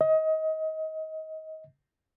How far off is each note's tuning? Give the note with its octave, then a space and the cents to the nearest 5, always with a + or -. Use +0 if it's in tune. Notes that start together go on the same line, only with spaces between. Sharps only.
D#5 +25